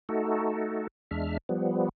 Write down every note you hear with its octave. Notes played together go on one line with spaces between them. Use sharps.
A3 D#4 F#4 A4
E2 G#3 D4 E5 F6
F3 G3 B3